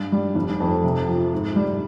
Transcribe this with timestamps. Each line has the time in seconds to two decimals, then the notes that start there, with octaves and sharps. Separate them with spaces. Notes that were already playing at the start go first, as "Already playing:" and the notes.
Already playing: G2
0.12 G3
0.35 F1
0.60 F2
0.84 C3
1.08 F3
1.33 G#2
1.56 G3